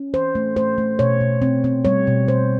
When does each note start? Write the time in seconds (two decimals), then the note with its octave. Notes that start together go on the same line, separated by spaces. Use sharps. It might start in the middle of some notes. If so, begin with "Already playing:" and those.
Already playing: C#4
0.13 E3 C5
0.35 A3
0.56 A3 C5
0.78 A3
0.99 B2 C#5
1.21 B2
1.42 C4
1.64 C4
1.85 G3 C#5
2.07 B2
2.28 B2 C5